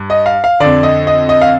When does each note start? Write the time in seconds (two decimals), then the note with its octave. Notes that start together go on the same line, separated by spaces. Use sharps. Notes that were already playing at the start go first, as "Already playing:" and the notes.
Already playing: G2
0.10 D#5
0.26 F5
0.44 F5
0.60 F2 D3 D5
0.83 D#5
1.07 D#5
1.29 D#5
1.41 F5